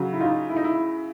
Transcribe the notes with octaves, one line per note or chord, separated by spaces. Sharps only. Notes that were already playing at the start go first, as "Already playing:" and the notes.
Already playing: C#3 F#3
E4
D#4 F4
E4
D#4
E4